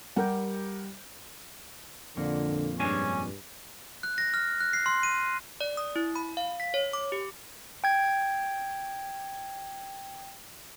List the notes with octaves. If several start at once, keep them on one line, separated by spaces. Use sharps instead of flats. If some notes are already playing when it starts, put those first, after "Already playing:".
G3 G4 A#4 F#5 G6
F2 A#2 D3 A#3
G2 G#3 C#4 D4 G#5
F#6
A#6
F6
F#6
C7
C6
D#7
D5
D#6
E4
B5
F5
B6
C#5
D6
G4
G5 G#6